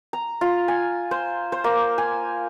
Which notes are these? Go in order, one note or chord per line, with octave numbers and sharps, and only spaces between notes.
A#5
F4
G#5
C5
C5
A#3
G#5